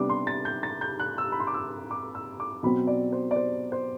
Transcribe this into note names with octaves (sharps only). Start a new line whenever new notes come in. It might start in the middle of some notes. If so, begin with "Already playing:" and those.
Already playing: C3 G3 B3 D4 D6
C6
A6
G6
A6
G6
F#6
E6
B5
C6
D6
E6
D6
E6
D6
B2 F#3 C4 B5
D5
C5
D5
C5
C5